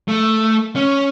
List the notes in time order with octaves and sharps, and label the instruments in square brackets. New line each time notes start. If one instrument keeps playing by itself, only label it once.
[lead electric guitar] A3
C#4